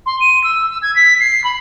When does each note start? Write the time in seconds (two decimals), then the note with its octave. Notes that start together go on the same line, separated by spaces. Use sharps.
0.06 C6
0.20 D#7
0.44 E6
0.70 E6
0.82 G#6
0.95 B6
1.20 C7
1.44 B5